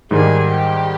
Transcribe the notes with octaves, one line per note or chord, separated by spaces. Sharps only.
G#2 D#3 G3 G#4
G4